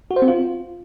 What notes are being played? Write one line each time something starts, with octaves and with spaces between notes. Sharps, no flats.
F#4
C5
C4
F4